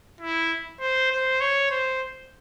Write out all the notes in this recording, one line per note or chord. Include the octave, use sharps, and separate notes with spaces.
E4
C5
C5
C#5
C5